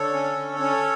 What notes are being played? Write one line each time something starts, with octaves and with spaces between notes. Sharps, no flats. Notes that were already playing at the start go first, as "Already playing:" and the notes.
Already playing: D3 A4 C#5
C#4
D3
C#4